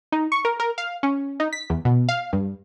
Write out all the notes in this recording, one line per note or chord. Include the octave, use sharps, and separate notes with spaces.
D#4
C#6
A#4
A#4
F5
C#4
D#4
B6
E2
B2
F5
G2